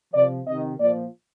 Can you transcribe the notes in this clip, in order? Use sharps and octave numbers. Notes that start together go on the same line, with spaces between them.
C3 F3 D5
C3 D#3 D#5
A#2 F3 D5